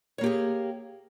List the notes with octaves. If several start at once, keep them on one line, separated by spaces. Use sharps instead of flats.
A#3 G4 G#4 C#5